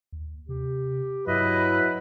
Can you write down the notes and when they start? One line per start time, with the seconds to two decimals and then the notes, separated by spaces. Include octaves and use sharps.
0.12 D#2
0.49 C3 G4
1.27 G2 F#3 E4 B4 D#5